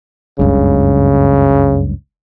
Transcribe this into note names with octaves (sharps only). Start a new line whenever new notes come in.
F#1 C#2 G2 C#3